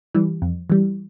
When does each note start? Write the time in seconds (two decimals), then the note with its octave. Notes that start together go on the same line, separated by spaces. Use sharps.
0.15 E3 G3
0.42 F2
0.70 E3 G3